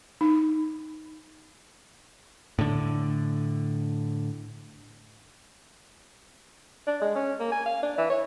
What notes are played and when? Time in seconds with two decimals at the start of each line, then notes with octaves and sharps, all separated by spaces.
0.21 D#4
2.59 A2 D3
6.87 D4
7.01 G#3
7.16 C#4
7.40 A#3
7.52 G#5
7.66 F5
7.83 D4
7.98 E3
8.10 C#5